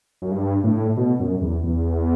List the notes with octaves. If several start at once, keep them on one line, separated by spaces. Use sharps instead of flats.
F#2
G2
A2
B2
F#2
E2
E2